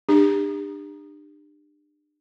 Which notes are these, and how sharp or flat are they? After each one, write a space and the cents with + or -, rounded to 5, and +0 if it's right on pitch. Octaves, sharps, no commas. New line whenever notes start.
D4 +35 G4 +30